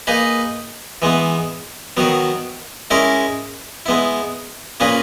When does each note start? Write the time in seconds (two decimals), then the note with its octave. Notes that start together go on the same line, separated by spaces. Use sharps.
0.07 A#3 D#4 G#4 B4
1.02 E3 G#3 B3
1.97 D#3 F#3 B3
2.90 G#3 C#4 E4 A#4
3.86 G#3 B3 E4
4.80 A#2 A#3 C#4 G#4 B4